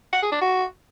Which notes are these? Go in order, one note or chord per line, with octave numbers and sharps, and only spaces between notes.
F#5
G#4
D4
F#4